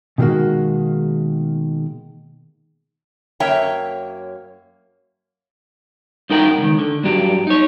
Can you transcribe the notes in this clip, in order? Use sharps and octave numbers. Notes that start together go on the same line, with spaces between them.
B2 D#3 G3 G#3 A#3 F#4
F#2 A#3 C#5 E5 G5 A#5
G2 D#4 A#4 F#5 G5
C#2 D#3
D3
G2 F#3 G4
D#4 C#5